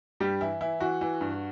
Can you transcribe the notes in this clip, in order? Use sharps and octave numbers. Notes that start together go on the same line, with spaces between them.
G2 G3 G4
E3 E4
E3 E4
E3 F#4
E3
G2